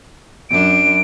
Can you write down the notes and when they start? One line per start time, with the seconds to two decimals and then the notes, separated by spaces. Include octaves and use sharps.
0.50 F#2 D4 D7